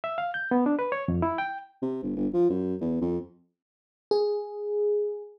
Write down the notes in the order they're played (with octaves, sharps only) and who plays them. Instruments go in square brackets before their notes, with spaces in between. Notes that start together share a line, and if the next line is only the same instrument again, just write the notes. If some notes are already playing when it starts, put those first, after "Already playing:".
[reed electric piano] E5
F5
G6
B3
D4
B4
C#5
F2
E4
G5
[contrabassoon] C3
G1
G1
F3
F#2
E2
F2
[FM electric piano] G#4